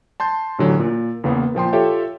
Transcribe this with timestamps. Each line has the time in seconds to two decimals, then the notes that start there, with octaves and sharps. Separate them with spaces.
0.20 A5 C6 G6
0.59 A1 D3 F#3
0.79 A#2
1.24 E2 C#3 A#3 B3
1.55 A#2 F3 G5 C6
1.73 F4 G4 A4 C#5 E5 G5